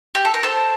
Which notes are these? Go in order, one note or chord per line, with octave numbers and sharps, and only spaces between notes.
G4
A4
A#4
A4 C5